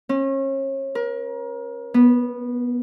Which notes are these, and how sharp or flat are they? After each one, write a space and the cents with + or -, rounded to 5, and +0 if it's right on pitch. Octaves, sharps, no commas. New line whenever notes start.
C#4 -35
A#4 +30
B3 -15